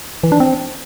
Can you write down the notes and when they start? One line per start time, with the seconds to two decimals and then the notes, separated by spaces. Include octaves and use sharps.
0.23 E3
0.32 D4
0.40 C4